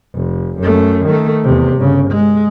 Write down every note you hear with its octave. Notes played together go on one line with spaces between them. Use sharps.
F1
F#2 A3
D#3 A3
E2 C3
G1 C#3
G#3